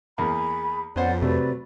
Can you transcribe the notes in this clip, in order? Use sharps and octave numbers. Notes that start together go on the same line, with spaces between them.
E2 A#3 G#4 B5
F2 B3 C#4 C5 D5 F#5
C3 F#3 A3 B4 D5